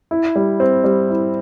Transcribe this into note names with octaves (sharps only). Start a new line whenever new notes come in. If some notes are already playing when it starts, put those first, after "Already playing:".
E4
G3
C4
G3
E4